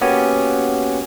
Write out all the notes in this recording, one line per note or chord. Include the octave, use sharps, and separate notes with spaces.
A#3 B3 C#4 F#4 G4 G#5